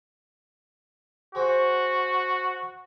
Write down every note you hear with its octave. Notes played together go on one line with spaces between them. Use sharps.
F#4 G#4 C5 G5